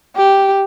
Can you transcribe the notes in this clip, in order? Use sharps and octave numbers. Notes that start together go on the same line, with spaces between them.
G4